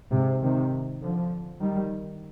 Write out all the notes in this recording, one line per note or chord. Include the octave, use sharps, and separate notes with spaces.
G#2 C3
C3 D#3
D3 F3
D#3 G3